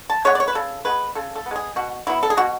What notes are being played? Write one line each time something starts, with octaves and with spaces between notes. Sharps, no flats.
A5
G#3 B3 C#5
D5
C#5
B4
C#3 A4
G#3 B3 B4
C#3 A4
A4
B3
G#3 G#4
B2 F#4
F#3 B3 E4
A4
G#4
B2 F#4